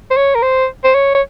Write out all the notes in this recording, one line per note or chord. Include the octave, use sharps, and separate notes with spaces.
C5
C#5
A#4
C5
C5
C#5
C#5